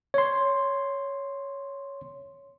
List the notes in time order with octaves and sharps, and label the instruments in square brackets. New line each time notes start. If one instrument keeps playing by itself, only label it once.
[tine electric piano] C#5 C6